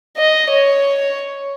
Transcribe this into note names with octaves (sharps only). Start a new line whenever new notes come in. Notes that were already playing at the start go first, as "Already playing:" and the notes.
D#5
C#5